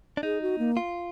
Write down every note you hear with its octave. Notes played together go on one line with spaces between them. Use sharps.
D4
D#4 G#4
F#4
A#3
F4